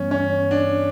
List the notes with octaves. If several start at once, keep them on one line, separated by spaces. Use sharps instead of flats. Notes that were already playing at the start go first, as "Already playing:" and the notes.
Already playing: G2 E3 G3 B3 C#4
C#4
D4